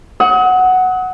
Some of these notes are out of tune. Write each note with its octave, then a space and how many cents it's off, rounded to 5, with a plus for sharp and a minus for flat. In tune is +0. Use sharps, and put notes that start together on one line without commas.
F#5 +0 D#6 +40